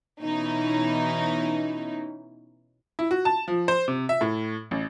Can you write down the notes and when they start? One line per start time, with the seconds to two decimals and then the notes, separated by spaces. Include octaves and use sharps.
0.20 B2 E3 C#4 D#4 E4
2.99 E4
3.11 F#4
3.25 A5
3.48 F3
3.68 C5
3.88 C3
4.09 E5
4.21 A2
4.71 A1